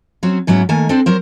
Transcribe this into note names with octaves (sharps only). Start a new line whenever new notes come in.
F#3 C4 C#4
G#2 F#3 B3 C#4 E4
D#3 A3 A#3 G#5
C4 D4 A4 C5
F#3 A#4 C5